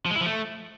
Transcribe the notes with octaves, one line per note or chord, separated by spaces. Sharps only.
F3
G#3
E4
F3
A3